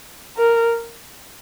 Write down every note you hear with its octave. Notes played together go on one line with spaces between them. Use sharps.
A#4